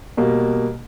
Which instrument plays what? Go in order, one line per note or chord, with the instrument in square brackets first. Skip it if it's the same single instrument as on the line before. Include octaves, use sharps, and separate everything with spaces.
[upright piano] B2 G3 A#3